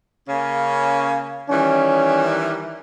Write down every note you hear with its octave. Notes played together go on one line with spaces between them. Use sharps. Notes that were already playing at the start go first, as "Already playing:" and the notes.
C#3 A#3 C#4
D#3 E3 G3 C#4